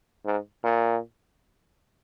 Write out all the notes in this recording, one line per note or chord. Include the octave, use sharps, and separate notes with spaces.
G#2
A#2